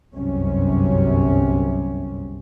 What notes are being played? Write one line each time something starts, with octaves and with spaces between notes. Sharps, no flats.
G1 C2 F#2 C3 C#4